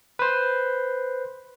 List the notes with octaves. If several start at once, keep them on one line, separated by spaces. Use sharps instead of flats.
B4 C5